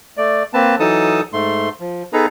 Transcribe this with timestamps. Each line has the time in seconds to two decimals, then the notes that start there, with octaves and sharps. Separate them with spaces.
0.17 A3 D5
0.54 A#3 C4 B4 A5
0.80 E3 F#3 D#4 A4 A5 D#6
1.33 G#2 A3 C6
1.80 F3
2.13 B3 D#4 G#4 A4 B4 A#5